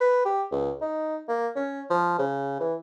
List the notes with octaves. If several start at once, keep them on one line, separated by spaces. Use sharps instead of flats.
B4
G4
C#2
D#4
A#3
C#4
F3
C#3
E3